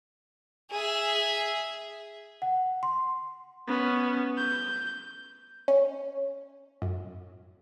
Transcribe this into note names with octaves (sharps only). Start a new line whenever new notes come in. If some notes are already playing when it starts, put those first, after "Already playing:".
G#4 E5
F#5
C6
B3 C#4
G6
C#4
F#2